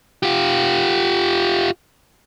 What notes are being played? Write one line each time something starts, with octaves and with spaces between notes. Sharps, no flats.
F4 G4